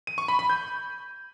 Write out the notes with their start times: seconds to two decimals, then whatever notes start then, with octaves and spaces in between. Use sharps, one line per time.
0.07 D#7
0.18 C#6
0.28 B5
0.39 B5
0.50 G6